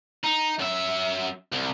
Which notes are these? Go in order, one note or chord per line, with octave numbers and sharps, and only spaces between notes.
D#4
F#2 E5
C2